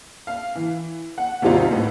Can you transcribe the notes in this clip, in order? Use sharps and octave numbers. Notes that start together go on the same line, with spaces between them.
F5
E3
F#5
G#1 D#2 C3 G3 D#4 F4
A2 B3